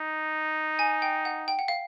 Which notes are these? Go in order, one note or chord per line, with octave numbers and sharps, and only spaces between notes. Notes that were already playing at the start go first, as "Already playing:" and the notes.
Already playing: D#4
G#5
G5
F#5
G5
F#5
F5